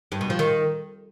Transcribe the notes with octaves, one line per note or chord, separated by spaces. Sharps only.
G2
B2
F3
D#3